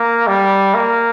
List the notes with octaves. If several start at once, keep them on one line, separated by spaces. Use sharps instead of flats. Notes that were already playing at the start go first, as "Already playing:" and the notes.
Already playing: A#3
G3
A#3